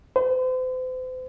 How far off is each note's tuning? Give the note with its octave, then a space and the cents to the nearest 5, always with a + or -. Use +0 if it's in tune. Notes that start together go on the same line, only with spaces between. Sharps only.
C5 -40